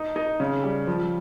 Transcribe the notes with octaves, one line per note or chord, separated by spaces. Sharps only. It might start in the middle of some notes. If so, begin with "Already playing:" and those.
Already playing: D#4
D#4
C#3
G3
F3